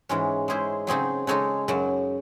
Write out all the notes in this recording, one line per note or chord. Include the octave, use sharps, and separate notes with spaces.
G#2 E3 G#3 C#4 F#4
G#3 C#4 E4 G#4 C5
C#3 F#3 C4 D#4 G#4
C#3 G#3 D#4 A4 C#5
F#2 C#3 F#3